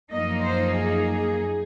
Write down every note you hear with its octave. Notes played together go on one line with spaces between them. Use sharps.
F#2 F3 A#3 D#4 D#5
C5
G#4